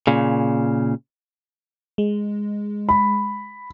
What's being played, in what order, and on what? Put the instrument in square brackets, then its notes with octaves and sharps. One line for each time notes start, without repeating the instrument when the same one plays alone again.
[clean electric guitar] A#2 C#3
[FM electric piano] G#3
[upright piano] B5